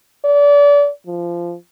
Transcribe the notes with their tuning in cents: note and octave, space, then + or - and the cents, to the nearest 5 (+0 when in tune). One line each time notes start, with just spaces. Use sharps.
D5 -30
F3 -15